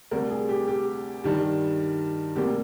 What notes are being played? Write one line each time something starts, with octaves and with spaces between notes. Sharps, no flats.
D2 C3 G3 A#4
G#4
G4
G4
G2 D#3 G3
D2 C3 G3 A#3 G4